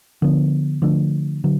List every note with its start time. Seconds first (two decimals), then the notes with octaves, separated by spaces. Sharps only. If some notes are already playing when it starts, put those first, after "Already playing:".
0.22 D3 F3 B3
0.82 D3 F3 A3 D4
1.44 D3 F#3